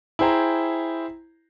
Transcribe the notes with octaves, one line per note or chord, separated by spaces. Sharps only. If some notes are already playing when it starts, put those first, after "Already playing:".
E4 G#4 C5 G5 A#5